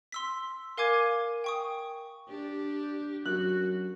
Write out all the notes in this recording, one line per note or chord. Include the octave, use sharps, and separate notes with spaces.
C6 E6 B6
A#4 F5 G#5 D6 G#6 D#7
G5 C#6 D#6
D4 G4
F#2 F#4 F#6